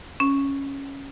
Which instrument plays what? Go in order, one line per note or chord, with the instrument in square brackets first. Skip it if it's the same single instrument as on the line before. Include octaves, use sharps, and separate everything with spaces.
[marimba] C#4